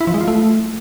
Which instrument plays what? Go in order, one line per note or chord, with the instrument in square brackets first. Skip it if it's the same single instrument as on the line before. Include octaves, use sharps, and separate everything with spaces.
[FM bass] E4
F3
G#3
F4
A3